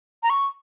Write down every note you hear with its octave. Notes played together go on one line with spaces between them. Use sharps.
A#5
C#6